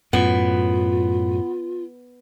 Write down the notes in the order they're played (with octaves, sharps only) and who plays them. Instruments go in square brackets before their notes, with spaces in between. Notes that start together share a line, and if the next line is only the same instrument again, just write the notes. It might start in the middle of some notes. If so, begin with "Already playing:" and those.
[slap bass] F#2 A2 [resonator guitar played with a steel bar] B3 [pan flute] F4